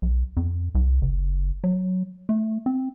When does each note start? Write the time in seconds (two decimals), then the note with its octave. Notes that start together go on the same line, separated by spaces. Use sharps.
0.02 B1
0.37 F2
0.75 C2
1.02 F#1
1.64 F#3
2.29 A3
2.66 C4